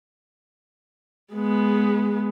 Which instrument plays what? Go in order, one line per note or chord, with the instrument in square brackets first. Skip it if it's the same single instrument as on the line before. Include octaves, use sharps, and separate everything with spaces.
[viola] G#3 B3